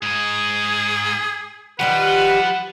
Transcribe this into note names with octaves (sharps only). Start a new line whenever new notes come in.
G#2 G#4 D#5
D#3 F3 G3 G4 B4 F#5